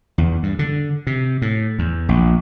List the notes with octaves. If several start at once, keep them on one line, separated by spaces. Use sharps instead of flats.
E2
G2
D3
C3
A2
E2
A#1